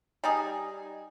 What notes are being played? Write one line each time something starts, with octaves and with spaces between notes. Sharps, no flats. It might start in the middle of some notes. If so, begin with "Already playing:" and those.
G3 D#4 G#4